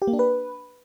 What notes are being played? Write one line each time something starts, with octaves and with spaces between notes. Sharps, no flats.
G4
A#3
D4
B4